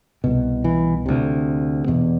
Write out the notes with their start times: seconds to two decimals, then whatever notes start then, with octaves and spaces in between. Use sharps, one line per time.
0.24 C2 B2
0.64 E3
1.06 D2 C3
1.88 E2 B2